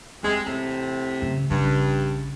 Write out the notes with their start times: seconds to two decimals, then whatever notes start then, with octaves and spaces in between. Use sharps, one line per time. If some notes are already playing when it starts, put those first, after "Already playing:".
0.23 D#2 C3 G3 G#3
0.46 E2 A2 C3
1.22 A1 C#3
1.50 A#1 G2 C#3